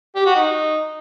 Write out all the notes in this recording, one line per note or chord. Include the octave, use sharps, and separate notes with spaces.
G4
F#4
D#4